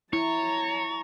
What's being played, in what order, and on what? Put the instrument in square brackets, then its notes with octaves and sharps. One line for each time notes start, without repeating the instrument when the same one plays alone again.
[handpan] E4 [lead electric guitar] C#5 [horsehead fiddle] A5 A#5